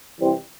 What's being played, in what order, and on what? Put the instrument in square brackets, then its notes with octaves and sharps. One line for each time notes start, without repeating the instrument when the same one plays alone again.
[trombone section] C3 E3 G3 C4